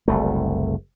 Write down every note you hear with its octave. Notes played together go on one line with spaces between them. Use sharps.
F#1 C2 A3